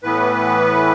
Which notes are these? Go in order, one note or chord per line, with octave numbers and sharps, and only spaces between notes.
A2 E3 B3 B4